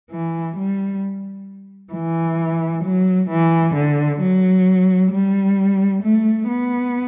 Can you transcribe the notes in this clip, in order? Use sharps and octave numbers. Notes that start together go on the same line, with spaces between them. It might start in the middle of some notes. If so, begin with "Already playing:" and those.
E3
G3
E3
F#3
E3
D3
F#3
G3
A3
B3